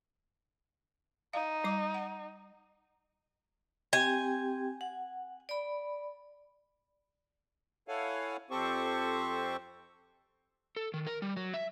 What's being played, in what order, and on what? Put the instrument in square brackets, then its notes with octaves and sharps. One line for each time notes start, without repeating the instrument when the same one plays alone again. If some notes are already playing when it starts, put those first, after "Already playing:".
[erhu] D#4 [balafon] F5
[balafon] G3 D6
F#5
[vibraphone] C4 G4 G5 [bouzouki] G#5
[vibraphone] F#5
D5 B5
[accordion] E4 A4 C#5 F5 F#5 G#5
F2 C4 G4 A4 C5 C#6
[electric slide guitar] A4
D#3
A#4
G3
F#3
E5